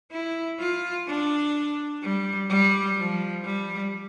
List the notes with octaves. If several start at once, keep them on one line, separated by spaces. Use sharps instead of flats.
E4
F4
D4
G3
G3
F3
G3